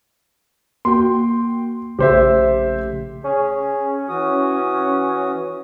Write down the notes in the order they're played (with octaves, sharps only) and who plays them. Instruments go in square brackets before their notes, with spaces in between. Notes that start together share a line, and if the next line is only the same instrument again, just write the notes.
[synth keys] A#3 F#4 G5 [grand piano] C6
[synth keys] A#1 C#3 A3 [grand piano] G4 C5 E5
[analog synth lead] C#4 [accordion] G#4
[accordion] E3 F#4 D#6